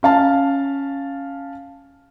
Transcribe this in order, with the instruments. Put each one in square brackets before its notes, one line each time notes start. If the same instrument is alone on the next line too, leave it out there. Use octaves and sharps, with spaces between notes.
[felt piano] C#4 F5 A5